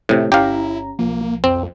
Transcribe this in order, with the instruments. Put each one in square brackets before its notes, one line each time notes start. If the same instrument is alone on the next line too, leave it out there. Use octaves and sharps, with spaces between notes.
[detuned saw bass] F2 [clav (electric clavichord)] A2 C3
[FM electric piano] G1 C#4 A#5 [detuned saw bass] E4 [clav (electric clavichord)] G4 F5
[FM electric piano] B1 F3 [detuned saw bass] A#3
[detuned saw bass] F2 [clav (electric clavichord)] C4